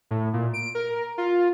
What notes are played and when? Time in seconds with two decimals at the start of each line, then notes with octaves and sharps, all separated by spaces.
0.11 A2
0.34 A#2
0.54 D7
0.75 A#4
1.18 F4